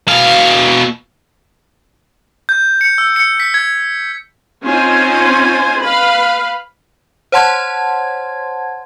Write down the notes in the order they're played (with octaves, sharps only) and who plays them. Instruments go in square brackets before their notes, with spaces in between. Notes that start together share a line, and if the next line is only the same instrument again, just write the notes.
[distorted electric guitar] B2 F5
[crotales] G6
C#7
E6
C#7
B6
G#6
[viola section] C4 C#4 D#4 F4 C5 G#5
B4 F5 B5
[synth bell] C5 C#5 F#5 A5 C6 G#6